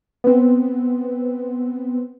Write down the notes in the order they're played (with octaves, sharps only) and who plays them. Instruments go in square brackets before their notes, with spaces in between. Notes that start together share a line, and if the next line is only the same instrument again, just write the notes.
[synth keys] B3 C4